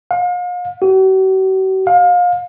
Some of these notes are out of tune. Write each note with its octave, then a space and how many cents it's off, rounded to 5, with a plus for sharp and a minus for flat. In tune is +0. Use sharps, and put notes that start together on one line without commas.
F5 +40
F#4 +45
F5 +30